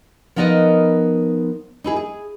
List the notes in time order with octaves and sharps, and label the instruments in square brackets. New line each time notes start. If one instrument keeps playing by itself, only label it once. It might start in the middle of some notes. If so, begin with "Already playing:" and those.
[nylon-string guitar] F3 B3 D#4 A#4 B4 D#5
D#4 E4 G#4
G#4